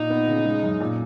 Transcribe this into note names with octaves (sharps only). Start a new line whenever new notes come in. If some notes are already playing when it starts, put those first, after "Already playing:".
Already playing: A#2 D#4
B3
C#3
G#3
F#2
A#2